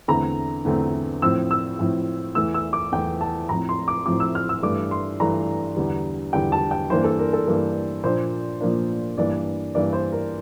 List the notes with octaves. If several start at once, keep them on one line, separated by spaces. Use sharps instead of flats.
E2 D3 A3 C4 A#5
E2 D3 A3 C4
A2 F3 C4 E6
E6
A2 F3 C4
E2 E3 A3 E6
E6
D6
E2 E3 A3 G5
A5
A2 F3 C4 A#5
C6
D6
A2 F3 C4 D6
E6
F6
E6
G2 E3 A3 D4 D6
C6
G2 E3 A3 D4 A#5
E2 D3 G3
E2 D3 G3 G5
A5
G5
G2 E3 A#3 D4 C5
A4
A#4
A4
G2 E3 A#3 D4 A#4
A#2 F3 A#3 D4 C5
A#2 F3 A#3 D4
G2 E3 A#3 D4 D5
G2 E3 A#3 D4 D5
C5
A#4